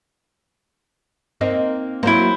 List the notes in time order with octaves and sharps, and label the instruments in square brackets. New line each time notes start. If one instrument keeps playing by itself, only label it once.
[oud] A#3 C4 D#4
[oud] F#3 A#3 [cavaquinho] E4 C5